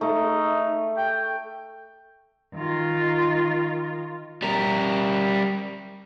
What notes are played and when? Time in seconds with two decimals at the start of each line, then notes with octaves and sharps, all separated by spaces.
0.01 A3 D#4
0.97 G5
2.55 D#3 F4
4.42 G3 A#4